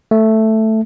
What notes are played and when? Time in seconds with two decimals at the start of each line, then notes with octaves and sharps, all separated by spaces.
0.11 A3